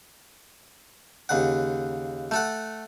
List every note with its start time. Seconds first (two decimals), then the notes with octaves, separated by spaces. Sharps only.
1.29 D#2 C#3 F#5
2.31 A3 A4 F#5